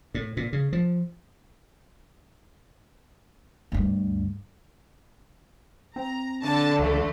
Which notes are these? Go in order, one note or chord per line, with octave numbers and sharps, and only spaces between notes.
A2
A#2
C#3
F3
D2 G2
C4 A#5
D3 A5
C#2 E3 A3